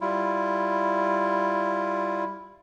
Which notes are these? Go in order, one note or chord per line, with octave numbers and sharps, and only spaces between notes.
G3 E4 F4